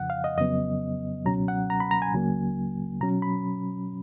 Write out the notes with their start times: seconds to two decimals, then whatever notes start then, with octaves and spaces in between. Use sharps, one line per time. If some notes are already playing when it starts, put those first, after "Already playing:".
Already playing: F2 C#3 F3 F#5
0.10 F5
0.24 D#5
0.38 F2 C#3 F#3 B3 D#5
1.25 C#2 B2 F#3 C#4 A#5
1.48 F#5
1.70 A#5
1.80 B5
1.91 A#5
2.02 G#5
2.13 C#2 C#3 F#3 A#3
3.00 B2 F#3 C#4 A#5
3.22 B5